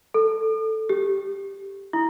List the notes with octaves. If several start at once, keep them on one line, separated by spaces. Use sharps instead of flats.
A4
G4
E4